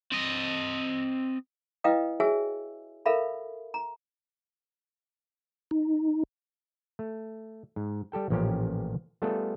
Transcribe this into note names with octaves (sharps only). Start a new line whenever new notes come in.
C4 D#5
E4 B4 D#5 F5 G5 D#6
F#4 G#4 C#5 E5 G#5 E6
A4 A#4 E5 F5 B5
A#5
D#4
A3
G#2
G3 G4 A4 G5
A1 A#2 F3 C#4 G4
G3 A3 B3 F4 G#4 A4